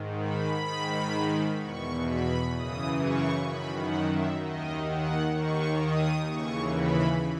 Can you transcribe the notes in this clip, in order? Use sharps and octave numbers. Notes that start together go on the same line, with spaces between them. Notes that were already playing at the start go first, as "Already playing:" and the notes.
Already playing: G#2 D#3
B5
G#2 D#3
E2 B2 C#6
B5
F#2 C#3 E3 D#6
C#6
F#2 D#3 B5
F#5
E5
D#2 D#3 D#5
F#5
D#2 D#3 C#6
D#6
D#2 C#3 E3 C#6
B5